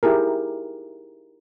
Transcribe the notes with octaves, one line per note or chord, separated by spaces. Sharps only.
D#4 E4 G4 G#4 A#4